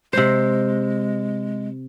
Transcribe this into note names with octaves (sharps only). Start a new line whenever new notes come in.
C3 G#3 C5